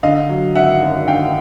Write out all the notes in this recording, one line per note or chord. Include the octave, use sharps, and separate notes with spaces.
D3 D#5 F5
F#3
G#1 E5 F#5
F#2
D3 F5 G5